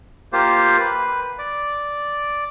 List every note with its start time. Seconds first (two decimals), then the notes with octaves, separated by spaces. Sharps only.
0.33 A#3 F4 G4 C5
0.80 B4
1.39 D5